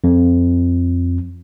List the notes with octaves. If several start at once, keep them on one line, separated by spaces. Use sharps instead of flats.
F2